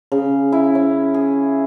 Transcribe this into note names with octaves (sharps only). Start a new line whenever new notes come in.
C#3
E4
C#4
G#4